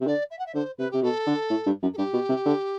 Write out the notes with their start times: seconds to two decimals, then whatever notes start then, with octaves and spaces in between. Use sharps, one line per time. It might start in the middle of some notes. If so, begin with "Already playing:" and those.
0.01 C3
0.07 D3 D5
0.31 E5
0.39 F#5
0.46 E5
0.54 D3 C5
0.78 C3 B4
0.91 C3 G4
1.02 B2 A4
1.27 D3
1.50 A2
1.66 G2
1.82 F#2
1.94 A4
1.97 G2 G4
2.14 B2
2.29 C3
2.46 D3